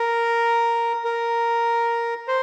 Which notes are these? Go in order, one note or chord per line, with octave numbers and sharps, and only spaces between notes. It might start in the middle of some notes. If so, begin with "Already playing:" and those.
Already playing: A#4
A#4
C5